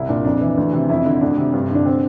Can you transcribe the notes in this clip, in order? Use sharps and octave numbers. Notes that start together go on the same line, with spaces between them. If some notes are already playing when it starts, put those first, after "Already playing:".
Already playing: C2 E4
A#2 D4
F2 D4
E3
D2
C3
F2 E4
D3
D2 D4
C3
G2
D3
D4
C4